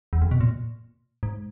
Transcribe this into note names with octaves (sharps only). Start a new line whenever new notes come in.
E2
F2
B2
A#2
G#2